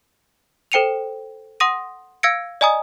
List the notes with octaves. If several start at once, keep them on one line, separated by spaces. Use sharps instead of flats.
A4 C5 G5 C#7 D#7 F7
F#5 C6 D#6 A#6 D#7
F5 E6 G#6 A#6 C#7 D7
D5 D#5 G#5 A#5 D#6